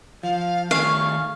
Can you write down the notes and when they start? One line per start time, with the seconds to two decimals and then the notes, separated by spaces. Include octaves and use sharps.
0.23 F3 F5
0.71 D#3 A3 G#4 F5 C#6